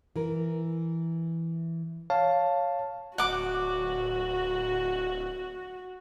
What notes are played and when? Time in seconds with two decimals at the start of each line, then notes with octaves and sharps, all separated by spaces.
0.16 E3 A#4
2.10 C#5 F5 A5
3.18 D1 F#4 F#5 D6